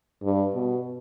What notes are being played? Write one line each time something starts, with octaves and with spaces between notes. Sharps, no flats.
G2
B2